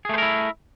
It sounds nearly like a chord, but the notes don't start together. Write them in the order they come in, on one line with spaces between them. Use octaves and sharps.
G#4 A3 C5 A#4 E4